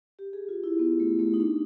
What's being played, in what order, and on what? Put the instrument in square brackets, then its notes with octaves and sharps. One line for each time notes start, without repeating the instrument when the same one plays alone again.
[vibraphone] G4
G#4
F4
E4
B3
A3
A3
D#4
D4